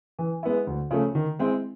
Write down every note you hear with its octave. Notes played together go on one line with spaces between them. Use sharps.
E3
G#3 B3 E4
D2
C#3 F3 A3
D#3
G#3 C4 E4